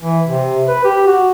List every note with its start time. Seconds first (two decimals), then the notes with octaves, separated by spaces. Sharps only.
0.02 E3
0.27 C3
0.68 B4
0.85 G4
1.06 F#4